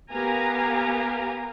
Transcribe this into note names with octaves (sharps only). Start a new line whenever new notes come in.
B3 G4 A#4 F5 G#5 A#5